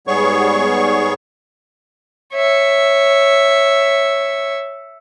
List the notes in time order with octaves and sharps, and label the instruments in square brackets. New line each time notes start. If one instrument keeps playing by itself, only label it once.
[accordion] G#2 G3 B3 G#4 C#5 C#6
[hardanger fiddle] C#5 E5